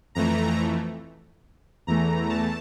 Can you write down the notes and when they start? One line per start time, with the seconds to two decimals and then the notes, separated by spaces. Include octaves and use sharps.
0.15 F2 E3 A3 A#5
1.87 E2 E3 A3 A#5
2.30 A5